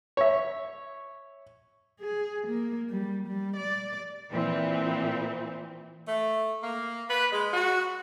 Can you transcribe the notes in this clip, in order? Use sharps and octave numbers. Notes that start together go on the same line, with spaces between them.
C#5 E5
G#4
A#3
G3
G3
D5
A#2 E3 C4
A3
A#3
B4
G#3
F#4